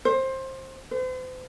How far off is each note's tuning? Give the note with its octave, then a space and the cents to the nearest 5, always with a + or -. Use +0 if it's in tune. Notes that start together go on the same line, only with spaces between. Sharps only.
C5 +20
C5 -40